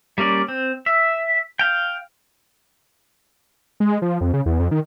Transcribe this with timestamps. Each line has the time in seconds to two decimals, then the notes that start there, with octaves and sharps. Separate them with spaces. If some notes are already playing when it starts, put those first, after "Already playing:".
0.18 G3 A#3 C#4 D5
0.48 C4
0.86 E5
1.59 F5 G5
3.80 G#3
4.02 F3
4.21 F2
4.33 C#3
4.46 E2
4.59 F2
4.71 D#3